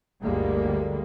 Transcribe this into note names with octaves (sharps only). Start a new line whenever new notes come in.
G1 D2 D3 G3 G#3 A#3